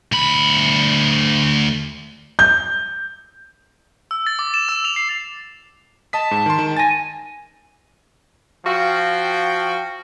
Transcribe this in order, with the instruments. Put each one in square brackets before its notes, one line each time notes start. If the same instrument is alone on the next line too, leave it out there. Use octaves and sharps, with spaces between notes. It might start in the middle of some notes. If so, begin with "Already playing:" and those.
[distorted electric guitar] D2 B5
[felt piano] G6
[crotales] E6
A6
D6
E7
E6
F7
C7
[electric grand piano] D#5 D#6 B6 [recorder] A5
[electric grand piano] G#2
D#3 C6
D#3
[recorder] G#5 [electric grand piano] A6 A#6
[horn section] F3 F#4 F5 G5